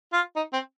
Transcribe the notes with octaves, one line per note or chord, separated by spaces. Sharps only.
F4
D#4
C4